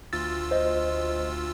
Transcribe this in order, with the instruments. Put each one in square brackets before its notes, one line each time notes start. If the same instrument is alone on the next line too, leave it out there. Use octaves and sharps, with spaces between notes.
[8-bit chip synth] D2 F4 E6 [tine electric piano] A6
[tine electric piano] C5 D#5